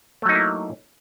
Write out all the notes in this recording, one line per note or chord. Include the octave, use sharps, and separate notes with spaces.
F#3 A3 A#3 D#4 E4